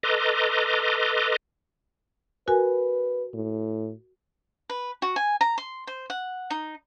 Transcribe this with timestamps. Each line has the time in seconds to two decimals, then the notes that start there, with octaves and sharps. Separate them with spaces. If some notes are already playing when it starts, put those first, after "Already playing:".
0.03 A4 B4 D#5 A#5 C6 D6
2.48 F#4 A#4 B4 G#5
3.34 A2
4.70 B4
5.02 F#4
5.16 G#5
5.41 A#5
5.58 C6
5.87 C5
6.10 F#5
6.50 D#4